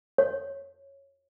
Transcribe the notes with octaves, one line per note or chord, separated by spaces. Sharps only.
C#5